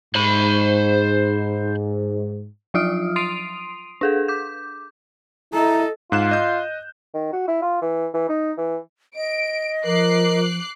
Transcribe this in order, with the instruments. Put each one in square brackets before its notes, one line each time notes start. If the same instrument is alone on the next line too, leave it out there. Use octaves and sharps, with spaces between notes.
[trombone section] G#2 [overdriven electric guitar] C5 B5
[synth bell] F3 F#3 F4 D#6 F6 D7
C6 D#6 C7 D7 D#7 F7
D4 G#4 A4
D6 G6
[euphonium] E4 [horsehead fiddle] A4 D#5 [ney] A#5
[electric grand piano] G#2 F#6 E7 [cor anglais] F4
[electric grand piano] D#5 G6
[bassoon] D#3
F#4
E4
F4
E3
E3
D#4
E3
[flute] D#5 [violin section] D7
[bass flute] F3 [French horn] A#4 [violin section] D6 F#6 C7